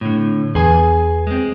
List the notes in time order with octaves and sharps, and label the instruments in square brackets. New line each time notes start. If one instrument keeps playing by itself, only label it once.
[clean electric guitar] A2 D3
[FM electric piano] E2 [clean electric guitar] G#4 G#5
[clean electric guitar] G#3 C4